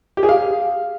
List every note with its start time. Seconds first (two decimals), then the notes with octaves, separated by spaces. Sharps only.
0.17 G4
0.23 G#4
0.29 F5